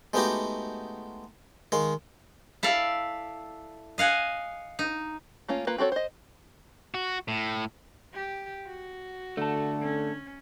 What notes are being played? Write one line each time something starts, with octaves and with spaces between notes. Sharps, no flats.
G#3 A3 B3 D#4 F#4 G4
D#3 G#3 F5
E4 A4 D5 F5
D#5 F5 F#5 G#5
D#4
A3 A#3 C#4 F4
A#3 F4 B4
C4 F#4 A4 C#5
C5 D#5
F#4
A2
G4
F#4
D3 A3 A4
C#4